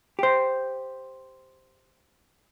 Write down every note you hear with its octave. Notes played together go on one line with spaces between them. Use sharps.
G4 C5